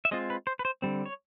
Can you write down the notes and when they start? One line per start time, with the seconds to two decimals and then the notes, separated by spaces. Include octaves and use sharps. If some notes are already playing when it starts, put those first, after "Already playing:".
0.05 E5
0.11 G#3 C4 F4 D#5
0.30 B4
0.47 C5
0.59 B4
0.65 C5
0.82 D3 G3 C4
1.06 C#5